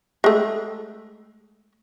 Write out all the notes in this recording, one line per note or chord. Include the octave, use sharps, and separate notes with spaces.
G#3 A3